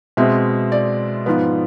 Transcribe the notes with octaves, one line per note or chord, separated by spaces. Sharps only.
B2 G#3 C4 E5
D5
G#2 F3 B3